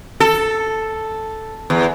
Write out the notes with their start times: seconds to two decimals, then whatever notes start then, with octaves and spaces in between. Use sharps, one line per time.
0.20 A4
1.70 E2